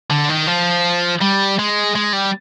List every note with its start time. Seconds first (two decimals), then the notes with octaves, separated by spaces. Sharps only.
0.11 D3
0.30 D#3
0.47 F3
1.21 G3
1.59 G#3
1.95 G#3
2.13 G3